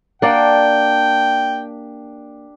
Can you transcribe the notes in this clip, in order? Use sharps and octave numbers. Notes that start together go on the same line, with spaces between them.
A#3 D4 G4 D5 F#5 G5